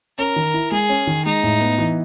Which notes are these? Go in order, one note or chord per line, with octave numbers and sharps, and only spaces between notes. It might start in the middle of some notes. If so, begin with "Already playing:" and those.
C#4 A#4
D#3
E4
G#3 G#4
C#4
D#3
G#3 D#4
A2
B3
E3